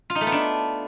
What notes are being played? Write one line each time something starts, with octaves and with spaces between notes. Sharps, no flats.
F4
D#4
A3
B3
D4